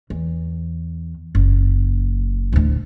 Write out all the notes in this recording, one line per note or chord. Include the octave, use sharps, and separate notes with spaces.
E2
F#1
D2 A2